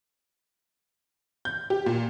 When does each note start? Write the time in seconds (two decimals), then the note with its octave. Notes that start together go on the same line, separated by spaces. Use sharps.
1.45 G6
1.70 G4
1.86 A#2